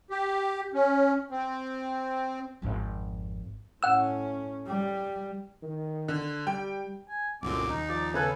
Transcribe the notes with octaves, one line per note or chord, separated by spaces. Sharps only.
G4
C#4
C4
G#1 F2
A2 C#4 F#5 E6
G3
D#3
D3
G3 G5
G#5
C2 F#2 A#2 D3 G#3 C4 D6
D#2 D#4
F3 D5
C#3 A4 B4 G#5 F#6